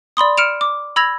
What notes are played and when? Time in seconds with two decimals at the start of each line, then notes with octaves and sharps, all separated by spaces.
0.17 D5 B5 C6 D#6
0.37 F6 C#7 D7 E7 F7
0.61 D6
0.96 B5 E6 G#6 A#6 F7